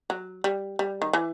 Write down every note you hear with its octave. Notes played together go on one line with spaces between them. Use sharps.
F#3
G3
G3
D#3
E3